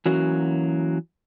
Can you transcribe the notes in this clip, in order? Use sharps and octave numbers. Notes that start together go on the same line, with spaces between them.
E3 F#3 A#3 C#4 F#4